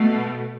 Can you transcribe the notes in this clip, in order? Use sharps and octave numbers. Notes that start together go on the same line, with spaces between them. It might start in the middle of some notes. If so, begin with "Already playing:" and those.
Already playing: B2 A3